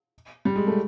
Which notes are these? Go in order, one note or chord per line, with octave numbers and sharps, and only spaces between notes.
G3
G#3
A3